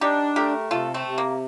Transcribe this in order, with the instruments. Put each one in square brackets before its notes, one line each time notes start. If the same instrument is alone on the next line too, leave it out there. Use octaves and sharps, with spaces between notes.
[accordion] D4 [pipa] D#4 G4
[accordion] A3 [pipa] G4 A#4
[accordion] C3 [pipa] F4 A4
[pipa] A3 C4
[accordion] C3
[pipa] A#3